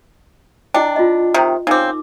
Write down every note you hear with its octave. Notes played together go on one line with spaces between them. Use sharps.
D4 E4 D#5 G5
F4 D#5
C3 D#3
C#3 C4 D#4 A#4 D6